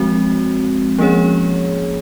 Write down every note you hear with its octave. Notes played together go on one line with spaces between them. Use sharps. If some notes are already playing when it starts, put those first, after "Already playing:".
Already playing: F3 G#3 C4 F#4
F3 A#3 C#4 G#4 C#5